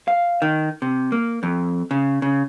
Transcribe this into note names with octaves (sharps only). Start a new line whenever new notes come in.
F5
D#3
C3
A#3
F2
C#3
C#3